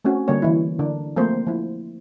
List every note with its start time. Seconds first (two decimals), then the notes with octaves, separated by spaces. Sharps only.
0.05 A3 C4 C#4 F#4
0.28 D3 G3 A#3 C#5
0.42 E3 E4
0.79 D3 D4 A#4
1.16 F3 A3 A#3 C4 C5
1.47 F3 E4